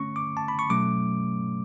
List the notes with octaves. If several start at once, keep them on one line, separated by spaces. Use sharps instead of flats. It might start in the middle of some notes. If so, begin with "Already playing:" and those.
Already playing: D3 A3 C#4 C#6
D6
A5
B5
C#6
B2 F#3 A3 C#4 D6